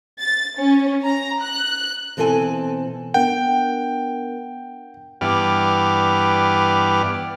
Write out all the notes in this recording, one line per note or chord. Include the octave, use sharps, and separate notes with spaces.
A6
C#4
A#5
F#6
B2 E3 C4 A4 C#5 G#5
B3 D4 A#4 F#5 G5
G2 E3 B3 G4 D5 F6